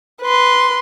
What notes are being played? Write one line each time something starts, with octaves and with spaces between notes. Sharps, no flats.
B4 C6